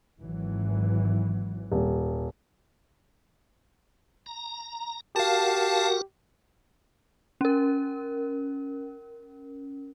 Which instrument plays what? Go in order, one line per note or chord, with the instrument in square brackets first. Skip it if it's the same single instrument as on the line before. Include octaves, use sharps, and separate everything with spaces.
[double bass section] G#1 E3 F#3
[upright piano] D#1
[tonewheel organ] A#5
[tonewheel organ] F#4 A#4 F#5 [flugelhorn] G4 [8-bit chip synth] F5 A5
[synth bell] C#4 A#4